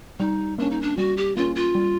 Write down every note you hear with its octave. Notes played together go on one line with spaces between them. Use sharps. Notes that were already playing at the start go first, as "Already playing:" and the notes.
G3 D#4
A#3 C#4 D4
D#4
D4
G3 F#4
G4
A#3 C#4 F4
F4
G3